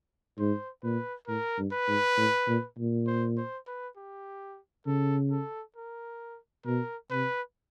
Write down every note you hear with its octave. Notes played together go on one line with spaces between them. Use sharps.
G#2 C5
A#2 B4
A2 A#4
G2
B4
G#2
A2
A#2
A#2
C5
C5
B4
G4
C#3 A4
A4
A#4
B2 A#4
C3 B4